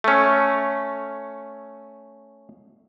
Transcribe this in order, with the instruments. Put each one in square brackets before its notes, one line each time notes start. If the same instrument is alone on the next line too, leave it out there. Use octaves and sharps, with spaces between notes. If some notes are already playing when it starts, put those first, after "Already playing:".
[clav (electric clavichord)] A3 C#4